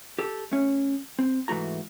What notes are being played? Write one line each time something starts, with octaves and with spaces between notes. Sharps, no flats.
G4 A4
A3 C#4
C4
G#2 E3 A3 F#4 A#5